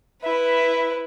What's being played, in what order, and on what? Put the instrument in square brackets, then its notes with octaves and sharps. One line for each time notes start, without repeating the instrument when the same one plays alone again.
[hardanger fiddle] E4 B4 [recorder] E5